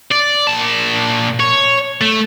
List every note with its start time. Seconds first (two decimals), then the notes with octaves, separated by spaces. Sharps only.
0.11 D5
0.47 A#2 A5
1.40 C#5
2.01 A3